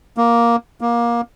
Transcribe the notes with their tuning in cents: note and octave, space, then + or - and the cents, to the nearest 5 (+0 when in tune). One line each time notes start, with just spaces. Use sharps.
A#3 +5
A#3 +20